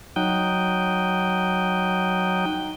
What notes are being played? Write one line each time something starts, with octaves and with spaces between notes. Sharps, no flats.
F#3 D#4 G5